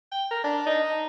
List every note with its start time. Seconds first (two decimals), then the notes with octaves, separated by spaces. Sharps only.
0.11 G5
0.31 A#4
0.44 D4
0.66 D#4